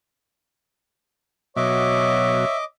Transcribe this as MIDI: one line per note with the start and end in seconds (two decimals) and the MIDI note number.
1.57 2.45 47
1.57 2.45 54
1.57 2.62 73
1.57 2.64 75
1.57 2.57 76
1.57 2.64 86